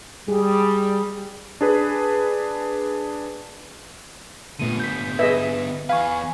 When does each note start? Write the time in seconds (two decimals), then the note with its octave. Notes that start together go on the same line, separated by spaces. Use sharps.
0.28 G3 G#4
1.61 D4 G#4 B4
4.59 A#2 D3 A3 B3 D#7
4.80 G6 B6
5.19 G#4 B4 D#5 E5
5.89 E2 B4 F5 G#5 C#6